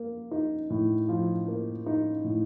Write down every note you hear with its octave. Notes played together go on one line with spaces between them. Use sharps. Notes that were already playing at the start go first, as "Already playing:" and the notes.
Already playing: A#3
D#4
A2
F3
A#3
D#4
A2